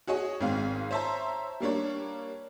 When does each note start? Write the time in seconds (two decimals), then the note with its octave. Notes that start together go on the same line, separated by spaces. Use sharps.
0.07 F#4 G#4 C#5 D#5
0.40 G#1 G#3 C4 F5
0.91 C5 C#5 E5 A5 A#5
1.60 G3 A#3 D4 C#5